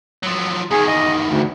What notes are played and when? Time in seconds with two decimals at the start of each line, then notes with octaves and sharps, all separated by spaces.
0.23 F3 F#3
0.71 E2 D#3 G#4
0.88 D#5
1.29 D2